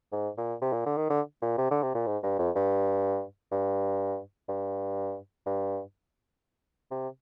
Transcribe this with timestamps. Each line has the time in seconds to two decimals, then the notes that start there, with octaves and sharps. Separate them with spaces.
0.12 G#2
0.38 A#2
0.62 C3
0.73 A#2
0.86 D3
0.97 D#3
1.10 D3
1.42 A#2
1.58 C3
1.71 D3
1.83 C3
1.95 A#2
2.06 G#2
2.23 G2
2.39 F2
2.55 G2
3.52 G2
4.48 G2
5.46 G2
6.91 C3